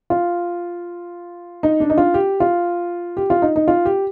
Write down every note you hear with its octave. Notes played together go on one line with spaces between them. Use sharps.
F4
D#4
D4
D#4
F4
G4
F4
G4
F4
D#4
D#4
F4
G4